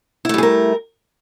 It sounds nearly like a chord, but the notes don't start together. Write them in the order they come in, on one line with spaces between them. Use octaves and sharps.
E4 A3 G3 G#4 A#4